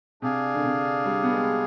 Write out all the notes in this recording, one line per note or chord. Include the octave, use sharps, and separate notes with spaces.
C3 D4 G#4 D5 F5 G#5
D3
C3
G3
B3
G#3